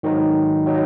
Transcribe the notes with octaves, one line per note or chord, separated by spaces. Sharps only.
G#2 D#3 F#3 D#4
D#3 F#3 D#4